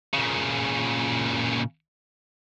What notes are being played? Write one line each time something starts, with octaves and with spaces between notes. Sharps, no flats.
A#2 C#3